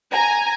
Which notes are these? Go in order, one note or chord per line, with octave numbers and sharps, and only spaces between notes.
G#5 A#5